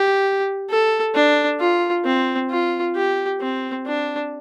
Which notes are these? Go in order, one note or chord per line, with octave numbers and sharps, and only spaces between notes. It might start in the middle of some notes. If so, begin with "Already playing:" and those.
Already playing: G4
A4
D4
F4
C4
F4
G4
C4
D4